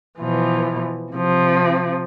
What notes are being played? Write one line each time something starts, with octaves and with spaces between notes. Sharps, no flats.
B2 E3 F3
C3 F3